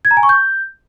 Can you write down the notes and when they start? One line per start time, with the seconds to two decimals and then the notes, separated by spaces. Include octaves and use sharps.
0.05 G#6
0.11 A#5
0.17 G#5
0.23 C#6
0.29 G6